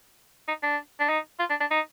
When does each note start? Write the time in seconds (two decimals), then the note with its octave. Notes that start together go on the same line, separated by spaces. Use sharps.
0.48 D#4
0.63 D4
1.00 D4
1.09 D#4
1.39 F4
1.50 D4
1.60 D4
1.71 D#4